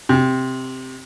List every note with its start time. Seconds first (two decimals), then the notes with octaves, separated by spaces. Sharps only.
0.09 C3